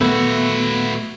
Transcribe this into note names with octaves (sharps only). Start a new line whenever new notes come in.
A#2 D#3 F#3 A3 B3 E4 F#4 B4